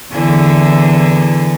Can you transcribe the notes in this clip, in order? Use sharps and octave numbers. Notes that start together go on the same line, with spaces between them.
E2 D3 E3